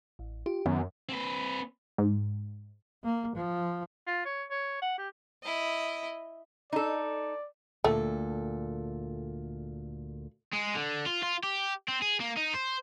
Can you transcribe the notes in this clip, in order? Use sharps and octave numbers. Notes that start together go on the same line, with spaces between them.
A1
F4 G4
F#2 D#3 B3
C4 B4
G#2
A#3
F3
F4
C#5
C#5
F#5
G4
E4 D#5
D#4 A4 D5
D2 A#2 A3 A4
G#3
D3
F4
F4
G4
C4
G#4
A#3
D#4
C5